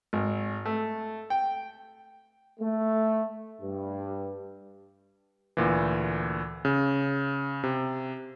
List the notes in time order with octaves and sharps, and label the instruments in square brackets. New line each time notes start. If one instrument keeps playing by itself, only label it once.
[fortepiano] G#1
A3
G5
[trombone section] A3
G2
[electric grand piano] D2 A#2 E3
C#3
C3